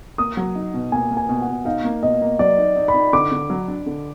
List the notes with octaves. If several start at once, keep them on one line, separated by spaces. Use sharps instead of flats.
A#3 D#6
F#3
D#4
B2
A#3 G#5
A#3
G#5
B2
F#5
B2
D#4 F5
A#3
B2 D#5
A#3
F#3 D5
D#4
D#4
B5
D#4
D3 D6
D3
F#3
D4
D3